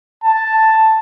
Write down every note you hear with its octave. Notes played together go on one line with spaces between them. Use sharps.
A5